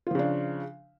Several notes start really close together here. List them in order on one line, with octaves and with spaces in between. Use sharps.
F4 F3 C#3 D4